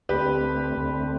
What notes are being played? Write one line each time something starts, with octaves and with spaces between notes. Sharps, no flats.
D2 D3 A3 C4 G4 B4
D2 D3 A3 C4